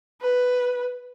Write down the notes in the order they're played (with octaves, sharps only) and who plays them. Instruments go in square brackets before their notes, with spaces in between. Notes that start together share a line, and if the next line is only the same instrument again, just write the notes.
[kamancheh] B4